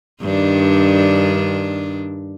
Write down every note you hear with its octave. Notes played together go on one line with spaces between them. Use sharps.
G2 D#3 D4